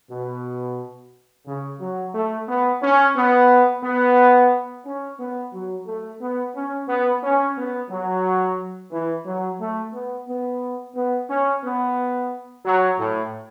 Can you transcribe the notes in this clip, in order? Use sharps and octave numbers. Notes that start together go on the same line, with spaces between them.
B2
C#3
F#3
A3
B3
C#4
B3
B3
C#4
B3
F#3
A3
B3
C#4
B3
C#4
B3
F#3
E3
F#3
A3
B3
B3
B3
C#4
B3
F#3
A2